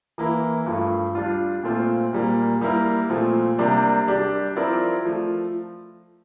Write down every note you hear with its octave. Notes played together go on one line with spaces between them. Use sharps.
E3 A#3 E4
G2 F3 A3
G3 D4 F4
A#2 A3 C4 F4 C5
A#2 G3 A#3
G3 A#3 E4 A#4
A#2 F3 A3 C4
C3 G3 A#3 D4
G3 D4 G4
F3 C4 E4 A#4 D5
F3 A3